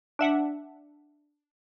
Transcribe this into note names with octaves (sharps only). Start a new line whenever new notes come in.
D4 E5 F#5